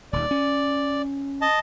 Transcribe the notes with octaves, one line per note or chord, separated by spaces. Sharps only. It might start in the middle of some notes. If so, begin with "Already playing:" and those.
D#1 D#2 D5
C#4
D#5 A5